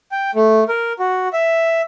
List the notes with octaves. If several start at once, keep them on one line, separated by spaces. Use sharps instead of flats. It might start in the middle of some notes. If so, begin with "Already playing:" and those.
G5
A3
A#4
F#4
E5